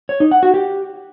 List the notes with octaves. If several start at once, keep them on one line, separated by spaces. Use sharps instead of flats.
C#5
D#4
F#5
F#4
G4